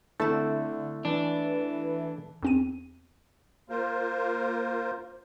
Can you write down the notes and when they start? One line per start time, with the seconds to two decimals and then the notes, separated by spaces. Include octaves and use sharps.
0.20 D3 A3 C4 E4 A4
1.05 E3 D4
2.43 E2 C4 D#7
3.69 A#3 F4 A#4 C5